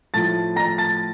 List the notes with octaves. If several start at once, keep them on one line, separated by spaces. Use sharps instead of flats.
A2 F3 A3 A5 A6
A#5 A#6
A5 A6